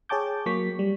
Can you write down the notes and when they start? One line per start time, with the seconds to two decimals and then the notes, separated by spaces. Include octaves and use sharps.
0.09 G#4 C#5 G5 A5 D6 G6
0.46 F#3 A#3 C#6 B6
0.79 G3